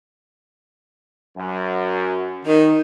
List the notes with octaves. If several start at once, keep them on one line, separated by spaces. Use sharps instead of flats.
F#2
D#3 D#4